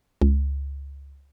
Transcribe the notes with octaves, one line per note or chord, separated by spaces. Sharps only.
C#2